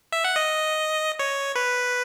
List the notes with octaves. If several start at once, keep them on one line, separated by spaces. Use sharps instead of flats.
E5
F#5
D#5
C#5
B4